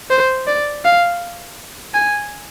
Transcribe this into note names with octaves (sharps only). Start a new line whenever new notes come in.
C5
D5
F5
G#5